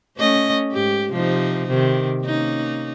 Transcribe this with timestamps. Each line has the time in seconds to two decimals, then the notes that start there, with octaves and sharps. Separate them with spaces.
0.17 A3 C#4 D#5
0.73 G#2 G4
1.11 C3 F3 D#4
1.68 C3 D#3
2.23 A#3 C#4 D#4